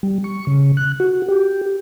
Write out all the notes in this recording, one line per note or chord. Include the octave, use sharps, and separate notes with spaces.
G3
C#6
C#3
F#6
F#4
G4